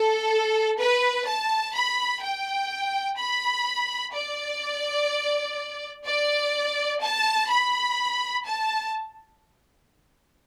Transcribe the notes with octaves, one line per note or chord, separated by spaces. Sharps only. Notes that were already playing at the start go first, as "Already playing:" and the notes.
Already playing: A4
B4
A5
B5
G5
B5
D5
D5
A5
B5
A5